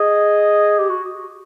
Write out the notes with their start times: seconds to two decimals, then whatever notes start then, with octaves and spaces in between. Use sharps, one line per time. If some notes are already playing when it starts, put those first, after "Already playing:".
Already playing: G#4 D#5
0.79 G4
0.90 F#4